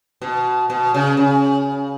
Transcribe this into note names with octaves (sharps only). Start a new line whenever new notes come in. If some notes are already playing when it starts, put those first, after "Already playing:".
B2
B2
C#3
C#3